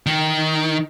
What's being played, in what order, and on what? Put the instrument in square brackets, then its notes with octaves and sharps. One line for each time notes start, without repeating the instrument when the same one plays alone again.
[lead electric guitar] D#3